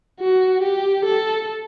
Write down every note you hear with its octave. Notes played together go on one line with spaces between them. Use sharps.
F#4
G4
A4